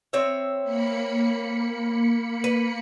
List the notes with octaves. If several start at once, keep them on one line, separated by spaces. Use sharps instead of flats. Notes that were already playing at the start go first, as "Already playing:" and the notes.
C4 C#5 E5
A#3 B5 C#7
B4